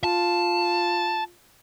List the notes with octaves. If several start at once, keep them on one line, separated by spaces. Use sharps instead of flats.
F4 A5